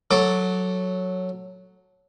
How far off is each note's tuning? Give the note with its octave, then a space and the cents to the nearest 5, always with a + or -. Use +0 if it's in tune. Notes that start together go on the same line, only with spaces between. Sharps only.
F#3 -5 A4 +0 D6 +0